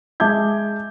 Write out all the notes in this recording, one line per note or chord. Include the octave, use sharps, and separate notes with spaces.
G#3 E5 A5 D6 G6 G#6